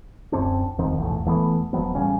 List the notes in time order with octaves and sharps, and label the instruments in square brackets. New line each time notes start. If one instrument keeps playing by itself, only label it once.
[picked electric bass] D1 F#2 C4 D4
D#1 F2 D#3 C4
F1 B1 E2 A2
E1 E3 A3 B3
D#1 F3 F#3 B3
A1 C#3 G3 C#4